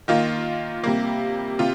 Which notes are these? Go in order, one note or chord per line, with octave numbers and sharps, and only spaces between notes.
D#3 A#3 F4
C3 G3 A#3
C3 F4